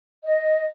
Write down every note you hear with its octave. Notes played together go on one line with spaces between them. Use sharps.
D#5